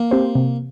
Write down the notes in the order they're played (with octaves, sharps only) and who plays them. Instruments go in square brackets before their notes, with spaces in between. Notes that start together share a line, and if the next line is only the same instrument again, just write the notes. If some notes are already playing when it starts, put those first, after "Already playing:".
Already playing: [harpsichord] A#3
[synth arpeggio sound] C4 G4 C5
C3